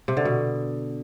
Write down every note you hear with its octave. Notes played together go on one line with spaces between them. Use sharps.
C3
D3
B2